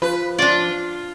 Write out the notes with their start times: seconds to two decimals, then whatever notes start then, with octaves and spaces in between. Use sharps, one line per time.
0.02 F3 B4
0.38 D4 F4 D5